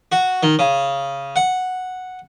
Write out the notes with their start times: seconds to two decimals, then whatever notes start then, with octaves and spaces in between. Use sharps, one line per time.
0.12 F#4
0.43 D#3
0.59 C#3
1.36 F#5